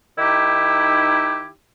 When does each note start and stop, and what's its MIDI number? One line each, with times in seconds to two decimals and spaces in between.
0.18 1.48 51
0.18 1.48 63
0.18 1.48 64
0.18 1.48 67